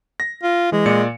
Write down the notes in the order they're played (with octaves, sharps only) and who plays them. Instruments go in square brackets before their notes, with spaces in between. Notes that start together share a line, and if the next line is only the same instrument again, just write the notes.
[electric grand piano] A#6
[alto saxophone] F4
[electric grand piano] E3 [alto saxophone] G#3
[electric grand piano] A#2 D5 C#7